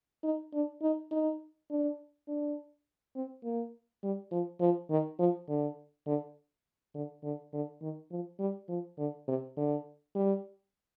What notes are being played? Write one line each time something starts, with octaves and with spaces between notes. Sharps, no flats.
D#4
D4
D#4
D#4
D4
D4
C4
A#3
G3
F3
F3
D#3
F3
D3
D3
D3
D3
D3
D#3
F3
G3
F3
D3
C3
D3
G3